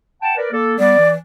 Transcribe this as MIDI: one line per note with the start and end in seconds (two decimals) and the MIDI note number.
0.22 0.36 78
0.22 0.36 79
0.22 0.36 81
0.37 0.52 70
0.37 0.52 71
0.37 0.52 74
0.53 0.75 58
0.53 0.75 69
0.79 0.95 55
0.79 0.95 59
0.79 1.10 74
0.99 1.16 52